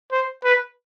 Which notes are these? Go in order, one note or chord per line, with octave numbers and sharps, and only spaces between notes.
C5
B4